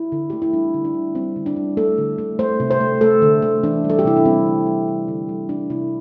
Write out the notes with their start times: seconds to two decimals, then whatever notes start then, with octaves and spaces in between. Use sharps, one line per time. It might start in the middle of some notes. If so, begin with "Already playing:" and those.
Already playing: E4
0.12 D3
0.30 A3 G4
0.42 E4
0.53 G3 D4
0.74 D3
0.85 D4
0.94 G3
1.15 G3 C4
1.36 D3
1.46 D4
1.56 G3
1.77 A3 A4
1.98 D3
2.18 A3
2.39 A3 C5
2.60 C3
2.71 C5
2.81 A3
3.01 A3 A4
3.22 D3
3.42 A3
3.63 E3 D4
3.84 G3
3.90 A4
3.99 G4
4.05 C3 E4
4.17 D4
4.25 G3 C4
4.46 D3
4.67 G3
4.88 G3
5.08 D3
5.29 G3
5.49 A3 D4
5.70 C3 E4